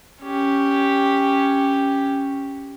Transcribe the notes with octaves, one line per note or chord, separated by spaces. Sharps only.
C#4 G4